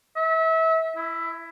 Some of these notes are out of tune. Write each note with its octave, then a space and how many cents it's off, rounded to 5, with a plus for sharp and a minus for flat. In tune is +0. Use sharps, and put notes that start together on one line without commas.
E5 -30
E4 +15